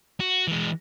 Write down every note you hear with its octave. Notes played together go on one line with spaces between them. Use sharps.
F#4
E3 G#3